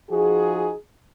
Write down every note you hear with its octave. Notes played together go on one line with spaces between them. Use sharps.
F3 D#4 F#4 G#4